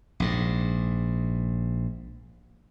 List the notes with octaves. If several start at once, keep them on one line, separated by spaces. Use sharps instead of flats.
A#1 G#2